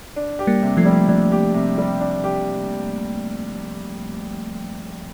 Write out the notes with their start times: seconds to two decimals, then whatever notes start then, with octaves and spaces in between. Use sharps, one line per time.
0.16 D4
0.39 G4
0.47 G3 A#3
0.62 C3
0.77 F3 A3
0.85 G3
1.08 F3 D4
1.32 G4
1.54 C3
1.78 G3
2.01 D4
2.24 G4